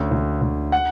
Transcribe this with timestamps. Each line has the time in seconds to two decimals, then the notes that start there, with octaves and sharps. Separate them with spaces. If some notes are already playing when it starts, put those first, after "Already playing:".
Already playing: D2 C#4
0.11 D2
0.42 D2
0.72 F#5